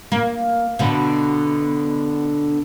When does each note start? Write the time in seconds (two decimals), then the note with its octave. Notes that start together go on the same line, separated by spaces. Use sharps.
0.12 A#3
0.79 B2 D3